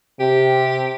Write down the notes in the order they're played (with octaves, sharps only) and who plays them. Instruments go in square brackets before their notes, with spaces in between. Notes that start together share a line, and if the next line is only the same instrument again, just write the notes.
[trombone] C3 [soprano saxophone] G4